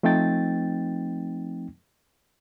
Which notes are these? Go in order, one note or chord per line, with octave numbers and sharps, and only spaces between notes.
F3 A3 C4 D#4 G5 A6